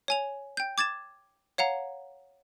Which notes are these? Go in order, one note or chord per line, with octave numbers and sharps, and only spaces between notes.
C#5 G#5 F7
G5 G6
D6 G#6 A6 E7
C#5 F5 F#5 A#5